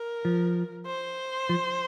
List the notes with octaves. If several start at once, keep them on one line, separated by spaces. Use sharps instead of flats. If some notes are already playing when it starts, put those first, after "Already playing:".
Already playing: A#4
F3
C5
F3